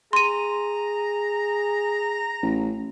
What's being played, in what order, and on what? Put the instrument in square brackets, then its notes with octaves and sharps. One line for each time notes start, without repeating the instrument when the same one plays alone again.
[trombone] G#4 [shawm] A#5 [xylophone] C6 D#7
[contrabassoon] A1